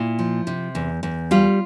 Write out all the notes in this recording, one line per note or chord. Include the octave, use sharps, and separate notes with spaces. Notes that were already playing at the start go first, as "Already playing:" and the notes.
Already playing: A#2 E4
F3
C3
E2
E2
G3 F4